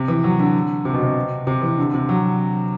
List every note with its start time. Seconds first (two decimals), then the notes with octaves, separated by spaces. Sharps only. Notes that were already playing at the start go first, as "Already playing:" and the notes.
Already playing: C3
0.08 E3
0.24 F#3
0.39 D3
0.85 C3
0.93 B2
1.03 C3
1.47 C3
1.62 E3
1.77 D3
1.94 C3
2.09 F#3